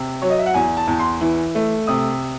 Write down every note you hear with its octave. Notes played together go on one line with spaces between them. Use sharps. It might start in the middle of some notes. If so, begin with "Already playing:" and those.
Already playing: C3
F#3 C#5
D#5
E5
F#5
E2 G#5
A5
E2
C6
E3
A3
C3 D#6